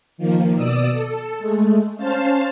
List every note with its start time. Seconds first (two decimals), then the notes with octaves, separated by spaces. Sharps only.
0.18 D#3 F3 A#3
0.56 B2 D5 D#6 E6
0.92 A4
1.38 G#3 A3
1.97 C#4 C5 F5 A5